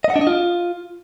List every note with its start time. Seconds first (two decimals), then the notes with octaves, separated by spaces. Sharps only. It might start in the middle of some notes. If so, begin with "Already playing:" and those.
0.04 D#5
0.10 F#5
0.16 D4
0.21 D#5
0.27 F4